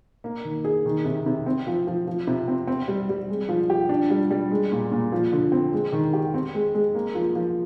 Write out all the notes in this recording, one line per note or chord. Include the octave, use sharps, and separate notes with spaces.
A#3
D#3
G#4
D#3
C3
C3
C4
F3
F3
F3
C3
C4
C4
G3
G3
G#3
F3
G4
D4
G3
G3
G#3
A#2
A#2
F3
D3
C4
G#3
D#3
G4
C4
G#3
G#3
A#3
F3
F3